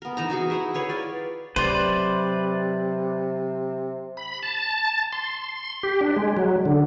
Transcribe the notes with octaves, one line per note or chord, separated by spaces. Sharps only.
B3 A#4
E3 D#4 A#5
D#4 F#4 G#4 C#6
E4 E5 F#5 A#5
G#4 B4 C#5
F4 C#5 D5 G5
C3 F#3 B4 C5 D5
B5
A5
C6
G4
D4
G#3
F#3
D3